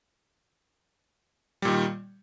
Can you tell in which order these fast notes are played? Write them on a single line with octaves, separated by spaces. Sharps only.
G3 A#2 D#3